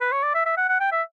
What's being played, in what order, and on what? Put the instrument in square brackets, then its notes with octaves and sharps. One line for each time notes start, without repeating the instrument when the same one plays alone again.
[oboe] B4
C#5
D5
E5
E5
F#5
F#5
G5
E5